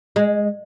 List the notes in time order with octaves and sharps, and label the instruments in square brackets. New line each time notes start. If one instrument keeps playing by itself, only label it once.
[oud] G#3